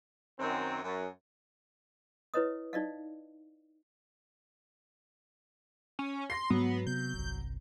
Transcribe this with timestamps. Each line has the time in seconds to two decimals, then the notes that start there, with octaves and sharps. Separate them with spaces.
0.40 F#2 D#3 C4
0.83 F#2
2.34 E4 B4 C#5 D#5 D#6
2.73 D#4 D5 D#5 F5
5.99 C#4
6.30 C6 A#6 C7
6.50 G#2 F#3 B3
6.87 C3 B3 G6
7.14 G1 C2